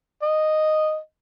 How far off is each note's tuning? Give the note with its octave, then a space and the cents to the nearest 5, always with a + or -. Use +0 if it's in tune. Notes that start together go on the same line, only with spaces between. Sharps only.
D#5 -5